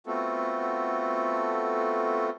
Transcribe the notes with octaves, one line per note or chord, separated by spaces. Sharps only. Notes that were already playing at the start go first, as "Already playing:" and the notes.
A3 B3 C4 F4 F#4 A4